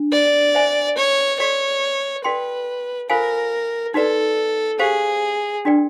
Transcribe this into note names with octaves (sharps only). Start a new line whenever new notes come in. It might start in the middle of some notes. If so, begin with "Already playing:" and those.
Already playing: D4
D5
C5 E5 G#5
C#5
F#4 A4 C#5 D5
F#4 A4 B4 D5 G5 C6
F4 A4 A#4 C5 F5 G#5
D#4 F#4 A4 B4 D5
G4 G#4 C5 F5
D4 F#4 A#4 D5 G5